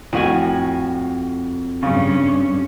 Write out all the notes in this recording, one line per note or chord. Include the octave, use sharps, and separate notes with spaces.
F2 A2 F#4 G#5
G2 C#3 C#4